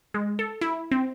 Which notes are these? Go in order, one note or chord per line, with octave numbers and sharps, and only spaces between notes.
G#3
A4
E4
C4